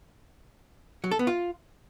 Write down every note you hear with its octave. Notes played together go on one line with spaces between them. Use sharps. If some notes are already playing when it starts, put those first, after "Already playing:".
F#3
A4
B3
F4